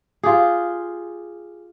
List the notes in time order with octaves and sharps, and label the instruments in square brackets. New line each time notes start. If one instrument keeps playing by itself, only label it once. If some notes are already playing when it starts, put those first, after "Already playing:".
[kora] F4 G4 G#4